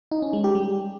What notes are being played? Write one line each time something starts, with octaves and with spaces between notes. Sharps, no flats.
D#4
C#4
G#3
G4
G3